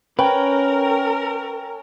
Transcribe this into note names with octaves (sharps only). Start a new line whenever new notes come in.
C#4 A#4 B4 G5